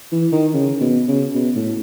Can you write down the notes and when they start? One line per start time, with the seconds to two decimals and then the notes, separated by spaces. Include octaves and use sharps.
0.12 E3
0.32 D#3
0.53 C#3
0.81 B2
1.08 C#3
1.35 B2
1.56 A2